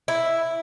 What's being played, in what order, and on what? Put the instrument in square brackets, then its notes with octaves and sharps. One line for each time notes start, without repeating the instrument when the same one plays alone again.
[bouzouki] E4